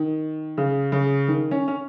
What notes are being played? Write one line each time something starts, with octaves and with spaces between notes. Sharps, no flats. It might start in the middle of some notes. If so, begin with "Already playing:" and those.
Already playing: D#3
C#3
C#3
D#3
C#4
C#4